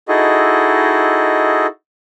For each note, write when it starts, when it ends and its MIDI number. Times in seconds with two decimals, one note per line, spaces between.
0.08 1.67 63
0.08 1.67 64
0.08 1.67 66
0.08 1.67 68
0.08 1.67 69
0.08 1.67 75